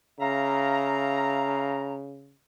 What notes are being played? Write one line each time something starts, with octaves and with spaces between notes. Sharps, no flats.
C#3 E5 F5 A#5